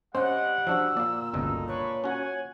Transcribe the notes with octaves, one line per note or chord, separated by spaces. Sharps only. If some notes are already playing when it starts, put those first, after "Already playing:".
G3 C4 C#4 C5 D#5 F#5
F3 D4 F#4 E6
A#2 D5 F5
G1 C#2 B2 D#4 A4
D4 B4 C#5 C#6
C#4 F#4 F#5 G#5